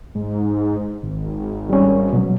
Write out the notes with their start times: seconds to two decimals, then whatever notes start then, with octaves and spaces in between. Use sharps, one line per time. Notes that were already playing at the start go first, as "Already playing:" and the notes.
0.15 G#2
1.03 G#1
1.70 G3 C#4
2.13 B2 F#3